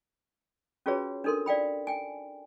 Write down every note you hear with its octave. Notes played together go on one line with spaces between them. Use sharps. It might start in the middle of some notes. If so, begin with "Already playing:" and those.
C#4 F4 F#4 G#4 B4 C#5
D4 D#4 A4 A#4 C6
D5 F5 G5 B5
G5 G#5